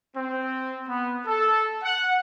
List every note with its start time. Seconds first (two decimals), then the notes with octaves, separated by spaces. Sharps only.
0.16 C4
0.89 B3
1.27 A4
1.84 F#5